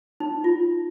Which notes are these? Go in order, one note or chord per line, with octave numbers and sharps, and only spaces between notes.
D#4
F4